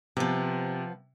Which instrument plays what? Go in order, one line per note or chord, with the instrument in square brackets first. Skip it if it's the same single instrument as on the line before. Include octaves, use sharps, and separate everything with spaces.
[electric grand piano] C3 [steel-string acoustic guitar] F3 B3